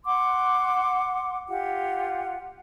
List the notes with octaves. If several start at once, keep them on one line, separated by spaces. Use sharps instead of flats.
F#5 C6 D6
F4 G4 F#5